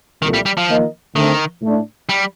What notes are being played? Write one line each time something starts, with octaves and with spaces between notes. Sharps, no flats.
C2 A#2 D#3 A3
G3
G3
F3
D#3 A#3 F4 A#4 D#5
D2 D3 D#3 A3 C4
A2 A3 D4
G3